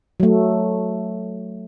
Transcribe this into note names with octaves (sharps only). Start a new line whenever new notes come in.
F#3 A3